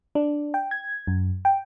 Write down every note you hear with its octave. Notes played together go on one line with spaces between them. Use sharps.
D4
G5
G#6
F#2
G5